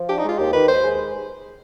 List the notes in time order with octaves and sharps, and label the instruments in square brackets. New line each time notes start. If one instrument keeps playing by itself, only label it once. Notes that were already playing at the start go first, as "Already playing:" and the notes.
Already playing: [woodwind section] F3
[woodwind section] D4 [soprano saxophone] G4
[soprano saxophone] D#4
[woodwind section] G#3 [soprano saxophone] F4
[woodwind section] D#2 [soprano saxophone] G4
[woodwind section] D#3 [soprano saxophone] B4
[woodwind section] D#2 [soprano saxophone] C5
[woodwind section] G#3